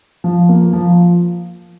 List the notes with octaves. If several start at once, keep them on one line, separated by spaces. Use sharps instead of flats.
F3
A#3
F3